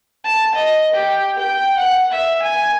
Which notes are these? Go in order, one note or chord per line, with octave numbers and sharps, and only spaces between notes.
A5
D#5
G4
G5
F#5
E5
G#5